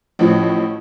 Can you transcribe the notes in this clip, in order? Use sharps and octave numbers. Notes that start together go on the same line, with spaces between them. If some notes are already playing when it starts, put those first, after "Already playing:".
A1 A2 F3